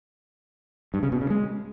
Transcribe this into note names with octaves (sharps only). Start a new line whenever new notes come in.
G2
C#3
B2
C#3
G#3